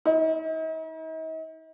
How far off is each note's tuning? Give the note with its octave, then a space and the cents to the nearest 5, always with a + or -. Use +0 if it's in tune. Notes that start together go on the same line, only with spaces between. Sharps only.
D#4 +45